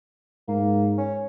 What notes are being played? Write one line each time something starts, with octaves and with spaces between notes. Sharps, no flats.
G#2 A#3
C#4